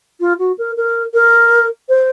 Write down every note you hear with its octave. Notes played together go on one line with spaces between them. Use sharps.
F4
F#4
A#4
A#4
A#4
C5